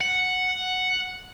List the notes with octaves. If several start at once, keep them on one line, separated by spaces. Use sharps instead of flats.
F#5